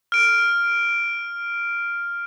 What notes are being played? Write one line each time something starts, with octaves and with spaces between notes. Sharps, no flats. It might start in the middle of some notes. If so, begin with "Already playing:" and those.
F6 D7